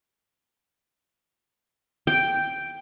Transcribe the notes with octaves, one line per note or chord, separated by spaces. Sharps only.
G5